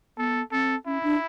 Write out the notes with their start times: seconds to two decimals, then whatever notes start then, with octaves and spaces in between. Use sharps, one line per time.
0.18 B3 A4
0.52 C4 A4
0.86 C#4 E4
1.03 D4